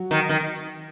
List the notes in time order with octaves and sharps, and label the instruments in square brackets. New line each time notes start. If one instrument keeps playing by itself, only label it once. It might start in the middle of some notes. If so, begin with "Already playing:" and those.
Already playing: [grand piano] F#3 F#4
[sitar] D#3
D#3